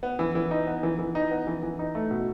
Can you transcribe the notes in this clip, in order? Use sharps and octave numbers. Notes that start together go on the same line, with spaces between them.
B3
E3
E3
D#4
B3
E3
E3
D#4
B3
E3
E3
D#4
A3
B2